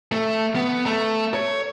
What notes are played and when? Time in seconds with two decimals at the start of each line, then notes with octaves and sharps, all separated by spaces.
0.12 A3
0.55 B3
0.86 A3
1.34 C#5